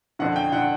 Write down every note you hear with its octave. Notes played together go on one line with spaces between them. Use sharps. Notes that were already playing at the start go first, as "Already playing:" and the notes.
F2 D3 F#5
G5
D3 F#5